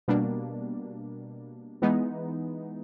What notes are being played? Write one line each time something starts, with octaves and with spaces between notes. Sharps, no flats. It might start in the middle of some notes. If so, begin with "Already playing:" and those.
B2 G3 A#3 D4
E3 G#3 B3 D#4